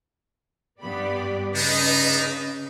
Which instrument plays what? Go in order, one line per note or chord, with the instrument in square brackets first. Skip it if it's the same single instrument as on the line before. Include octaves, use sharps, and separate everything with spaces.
[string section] G2 B3 B5 [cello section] G4 D5
[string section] C#3 [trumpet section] D4 D#4 [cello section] B4 D#5